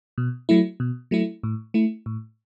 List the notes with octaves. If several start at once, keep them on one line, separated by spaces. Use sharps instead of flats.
B2
F#3 A3 E4
B2
F#3 A3 E4
A2
A3 E4
A2